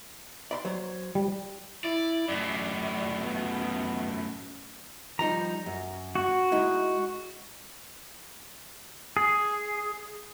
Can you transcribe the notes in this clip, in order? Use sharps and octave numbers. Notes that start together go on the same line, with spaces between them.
D5 B5 C6
F#3 C5 C#5
G3
E4 D5
F#2 A2 D5
B3
F3 G3 D#4 A#5
F#2
F#4
G#3 D#4 E4
G#4